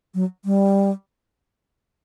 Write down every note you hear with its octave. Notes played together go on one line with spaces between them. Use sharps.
F#3
G3